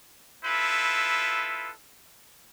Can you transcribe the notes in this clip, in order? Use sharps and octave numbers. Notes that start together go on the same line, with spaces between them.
E4 F4 A4 B4